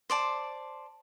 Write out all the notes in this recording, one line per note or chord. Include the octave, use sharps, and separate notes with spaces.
C5 D5 A5